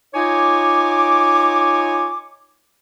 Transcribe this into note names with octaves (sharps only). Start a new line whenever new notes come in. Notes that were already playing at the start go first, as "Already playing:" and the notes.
D#4 F4 C#5 G#5 D6